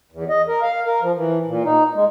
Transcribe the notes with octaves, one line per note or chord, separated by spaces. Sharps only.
E2
D#5
A#4
F5
A#4
F3
E3
A#2
D#4
G#3